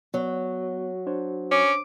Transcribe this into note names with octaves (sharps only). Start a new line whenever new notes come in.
F#3 B3
D4 C5 C#5
C#4 D6